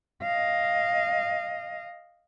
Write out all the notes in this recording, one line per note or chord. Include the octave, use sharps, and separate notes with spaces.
D#5 F5